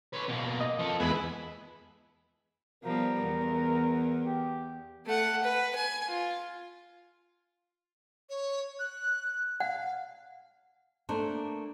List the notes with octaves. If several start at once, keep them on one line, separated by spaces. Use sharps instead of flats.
B4 C#5
B2 A#3
D#5
F3 A4
E2 G#3 B3 E4
F3 G3 B3 A#4
E2
G4
A3 F#5
B4
G#5
F4
C#5
F#6
F5 F#5
A3 A#3 D4 C5